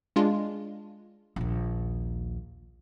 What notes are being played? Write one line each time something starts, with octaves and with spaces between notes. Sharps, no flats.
G#3 D4 F4
A#1 D#2